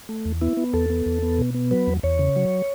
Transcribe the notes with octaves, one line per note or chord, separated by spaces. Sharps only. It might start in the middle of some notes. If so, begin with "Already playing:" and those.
A3
E2
B3 E4
B3
E2 A4
B3
E2
B3
B2
B3
F#3 B4
E2
E2 C#5
C#3
F#3